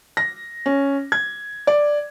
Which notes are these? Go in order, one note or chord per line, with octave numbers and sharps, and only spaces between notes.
A#6
C#4
G#6
D5